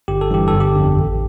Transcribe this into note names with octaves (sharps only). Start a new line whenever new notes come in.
G1 G4
A4
G2 E3 G4
A4
G1
G4
F2 D3
A1